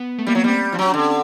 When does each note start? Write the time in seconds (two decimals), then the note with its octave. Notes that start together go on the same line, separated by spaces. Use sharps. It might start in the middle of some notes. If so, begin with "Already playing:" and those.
Already playing: B3
0.18 A3
0.27 G3 A#3
0.35 F#3
0.39 B3
0.44 G3 C4
0.72 F3 D4
0.79 F#3 C#4
0.89 D4
0.94 D3
0.99 C4